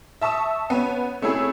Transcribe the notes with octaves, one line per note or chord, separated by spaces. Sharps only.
E5 A5 C#6 D#6 E6
B3 C#4
C3 A3 C#4 E4 G#4